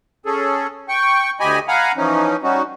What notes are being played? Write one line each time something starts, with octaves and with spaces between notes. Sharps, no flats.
C#4 G#4 A4
G5 C#6
D2 G4 D#5 G#5 B5
F5 F#5 G#5 A#5 B5
E3 F3 C#4 D#4
G3 C#4 D#4 F#4